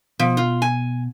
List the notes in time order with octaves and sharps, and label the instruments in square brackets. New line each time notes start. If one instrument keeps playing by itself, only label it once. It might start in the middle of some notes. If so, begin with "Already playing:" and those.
[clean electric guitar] B2 [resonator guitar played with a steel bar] F3
[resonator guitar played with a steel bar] F4
G#5